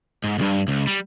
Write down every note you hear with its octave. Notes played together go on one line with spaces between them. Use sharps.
G#2
C2 G2
C#2
G3